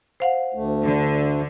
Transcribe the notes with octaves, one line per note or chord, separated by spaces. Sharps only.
C5 F5 F#5
D2 A3
D3